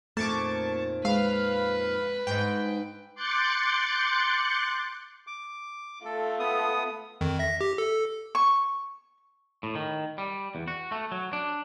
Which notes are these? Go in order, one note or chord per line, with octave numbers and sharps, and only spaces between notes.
F2 A#2 D#3 A3 A5 C#6 D6
G#3 B4 F5
G#2 D#4 G5
C6 D6 F#6 G6 A6 C#7
D6
A3 F4 A4
B3 D#6
F2 D#3
E5 A#6
G4
A4
C#6
A2
D#3
G3
E2
F#4
A3
F#3
D4